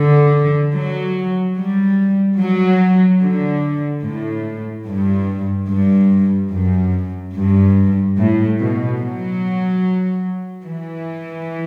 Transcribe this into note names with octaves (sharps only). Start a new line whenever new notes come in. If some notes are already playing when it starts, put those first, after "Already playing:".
Already playing: D3
F#3
G3
F#3
D3
A2
G2
G2
F#2
G2
A2
B2
F#3
E3